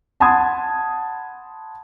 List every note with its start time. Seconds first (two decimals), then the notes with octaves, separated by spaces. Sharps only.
0.20 F#5 A5 B5 C6 D#6 G#6